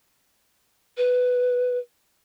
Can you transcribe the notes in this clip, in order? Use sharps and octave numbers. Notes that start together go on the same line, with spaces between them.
B4